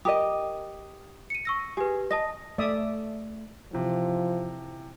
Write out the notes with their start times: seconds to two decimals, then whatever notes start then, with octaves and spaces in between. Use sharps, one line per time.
0.05 G4 A#4 D#5 D#6
1.30 C#7 D#7
1.45 C#6 E6 A#6
1.77 G4 G#4 B4
2.11 D#5 A5 D#6 A#6
2.58 A3 D5 E5 D#6
3.73 C3 E3 F3